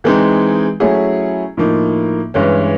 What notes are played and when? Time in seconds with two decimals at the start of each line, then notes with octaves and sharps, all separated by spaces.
0.04 E3 G#3 C4 D#4
0.80 F#3 A3 C#4 E4 G#4
1.57 A2 F3 A#3 D#4
2.34 G2 E3 G#3 C#4